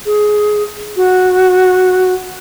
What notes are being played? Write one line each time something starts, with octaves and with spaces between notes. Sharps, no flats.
G#4
F#4